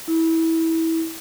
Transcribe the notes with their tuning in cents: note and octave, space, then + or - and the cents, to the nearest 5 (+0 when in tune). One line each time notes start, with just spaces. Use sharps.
E4 -20